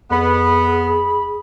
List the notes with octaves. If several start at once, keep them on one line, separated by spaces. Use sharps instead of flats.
F2 B3 G#4 B5